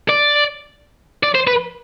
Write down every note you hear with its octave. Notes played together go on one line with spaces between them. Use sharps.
D5
D5
C5
B4